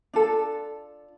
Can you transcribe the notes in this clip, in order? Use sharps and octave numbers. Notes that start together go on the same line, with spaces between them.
D4 F4 A4